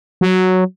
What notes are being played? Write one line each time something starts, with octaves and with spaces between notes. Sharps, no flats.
F#3